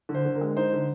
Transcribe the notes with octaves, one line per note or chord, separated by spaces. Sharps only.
D3
C5
D3
A#4
G#3
D#4 C5
D3